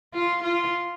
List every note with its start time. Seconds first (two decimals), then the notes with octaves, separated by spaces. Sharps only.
0.14 F4
0.43 F4